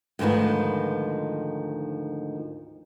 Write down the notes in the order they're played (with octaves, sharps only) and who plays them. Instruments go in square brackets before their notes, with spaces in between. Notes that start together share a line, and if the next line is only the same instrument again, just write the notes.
[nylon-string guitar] D2 G#2 D#3 F3 B4